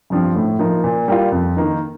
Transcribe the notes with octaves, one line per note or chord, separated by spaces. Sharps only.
G2 F3 C4
A2
F3 A#3 D#4
A#2
G3 A#3 F4
F2
D#3 A#3 D#4